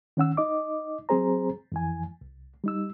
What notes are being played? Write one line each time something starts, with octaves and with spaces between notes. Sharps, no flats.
D#3 C#4 F#5 E6
D#4 D#5 D6
F#3 C4 G#4 C5 A#5
F2 E3 G#5
C2
G3 D#4 E6